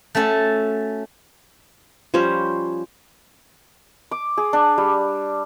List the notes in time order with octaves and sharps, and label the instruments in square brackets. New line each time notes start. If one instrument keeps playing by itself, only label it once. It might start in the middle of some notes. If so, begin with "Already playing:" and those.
[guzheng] A3 C#4 F#4 A4
[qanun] F3 G3 C#4 C5
[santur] D6
G#4
D4
G3